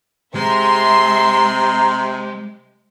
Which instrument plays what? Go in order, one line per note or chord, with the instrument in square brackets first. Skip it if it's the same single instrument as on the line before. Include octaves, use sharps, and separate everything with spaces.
[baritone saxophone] C3 [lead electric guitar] G#3 [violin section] E5 C6 [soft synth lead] A#5